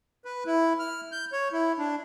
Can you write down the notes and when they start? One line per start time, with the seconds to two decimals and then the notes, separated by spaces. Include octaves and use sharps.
0.25 B4
0.46 E4
0.79 F6
1.12 G6
1.32 C#5
1.52 E4
1.78 D4